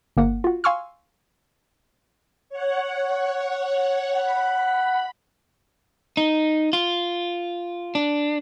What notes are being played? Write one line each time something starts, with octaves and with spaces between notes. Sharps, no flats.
G1 A#3 F#5
F4 F#4
F5 G#5 C6 C#6 E6 F6
C#5 F#5
F#5 B5
D#4
F4
D4